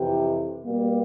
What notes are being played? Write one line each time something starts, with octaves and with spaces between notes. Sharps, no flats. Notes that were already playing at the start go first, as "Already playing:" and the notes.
Already playing: F2 C3 E3 G4
B2 G3 A#3